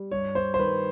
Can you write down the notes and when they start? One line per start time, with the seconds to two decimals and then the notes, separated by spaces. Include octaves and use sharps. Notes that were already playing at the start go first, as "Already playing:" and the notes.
Already playing: G3
0.11 G2 C#5
0.35 C5
0.54 C5
0.59 D#3 B4